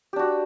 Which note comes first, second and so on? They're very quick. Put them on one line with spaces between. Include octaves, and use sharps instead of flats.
G4 D4 F#4